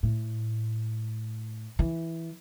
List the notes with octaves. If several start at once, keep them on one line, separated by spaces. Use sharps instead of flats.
A2
E3